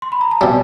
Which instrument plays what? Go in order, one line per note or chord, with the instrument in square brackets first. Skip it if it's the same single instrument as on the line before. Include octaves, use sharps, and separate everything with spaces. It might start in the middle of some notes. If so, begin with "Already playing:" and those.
[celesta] C6
B5
A#5
A5
[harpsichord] B2 G3 [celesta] G#5